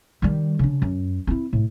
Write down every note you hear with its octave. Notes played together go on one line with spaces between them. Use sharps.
D#3 G3
C#3 D4
F#2
C4 E4
A2